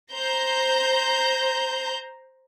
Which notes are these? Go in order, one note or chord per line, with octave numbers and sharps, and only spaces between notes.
C5 A#5 G6